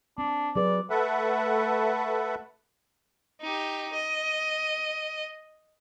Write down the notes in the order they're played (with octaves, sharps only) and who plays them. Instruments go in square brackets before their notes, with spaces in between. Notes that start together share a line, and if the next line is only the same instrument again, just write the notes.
[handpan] C4 [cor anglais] D4
[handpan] F#3 G#4 B4 [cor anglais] D5
[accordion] A3 A4 B4 E5 F#5
[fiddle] D#4 G4
D#5